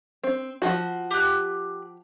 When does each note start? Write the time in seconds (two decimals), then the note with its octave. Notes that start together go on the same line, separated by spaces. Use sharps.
0.23 C4
0.62 F3 F#4
1.11 G4 F#6